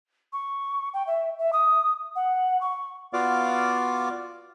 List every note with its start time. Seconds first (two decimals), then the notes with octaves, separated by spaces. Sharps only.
0.33 C#6
0.94 G5
1.07 E5
1.39 E5
1.53 D#6
2.16 F#5
2.61 C#6
3.13 B3 F4 F#4 D5 F5 D6